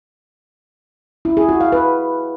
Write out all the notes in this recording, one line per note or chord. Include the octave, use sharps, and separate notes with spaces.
E4
G#4
F#4
F5
B4